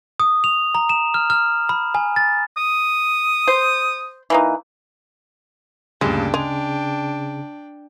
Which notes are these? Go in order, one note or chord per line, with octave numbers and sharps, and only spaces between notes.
D#6
F7
A#5
E7
F6
F6
B5
G#5
A6
D#6
C5
E3 A#3 D#4
D2 G2 A#2 C#3 G#3 D4 G5
G#3 F7